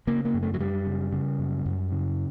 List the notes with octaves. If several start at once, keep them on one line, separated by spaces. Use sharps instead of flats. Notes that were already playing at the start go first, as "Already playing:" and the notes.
C#3 A#3
A#3
F#2
A3
F#3
F#2 G3
C#3
C#3
F#2
F#2
C#3